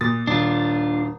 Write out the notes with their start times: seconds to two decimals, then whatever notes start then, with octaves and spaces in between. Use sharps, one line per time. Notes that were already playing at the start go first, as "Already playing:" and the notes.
0.01 A#2 D#6 A6
0.27 D#1 D4 F4